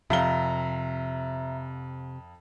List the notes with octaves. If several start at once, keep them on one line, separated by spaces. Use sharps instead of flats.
F2 C3 E5 F5 A#5 G7